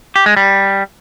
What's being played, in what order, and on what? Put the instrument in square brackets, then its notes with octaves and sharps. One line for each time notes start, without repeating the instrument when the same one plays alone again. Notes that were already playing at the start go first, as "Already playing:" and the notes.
[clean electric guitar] G4
G#3
G3